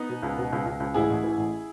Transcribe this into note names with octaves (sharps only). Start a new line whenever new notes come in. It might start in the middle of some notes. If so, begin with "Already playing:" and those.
Already playing: B3 D#4
B2
C#2
B2
C#2
C#2
C#2
A1 E4 G#4
A1
E3
A1